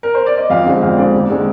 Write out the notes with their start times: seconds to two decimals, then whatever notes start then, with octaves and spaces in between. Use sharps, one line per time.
0.03 A#4
0.15 C5
0.26 D5
0.38 D#5
0.50 F2 F5
0.65 D3 G#3 C4
0.82 F2 F5
0.97 D3 G#3 C4 D5
1.13 D#2
1.29 D3 G#3 C4